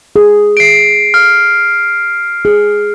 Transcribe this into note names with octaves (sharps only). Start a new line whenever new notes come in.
G#4
C7 D7
F6
G#4